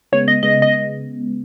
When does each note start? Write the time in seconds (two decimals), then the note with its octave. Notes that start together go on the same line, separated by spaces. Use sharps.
0.12 C#3 G#3 B3 C#5
0.28 D#5
0.43 C#3 G#3 B3 D#5
0.62 D#5